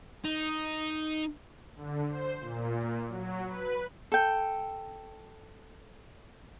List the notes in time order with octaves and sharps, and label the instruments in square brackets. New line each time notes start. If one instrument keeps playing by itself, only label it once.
[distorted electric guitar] D#4
[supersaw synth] D3
C5
A#2
F#3
B4
[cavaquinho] A4 G5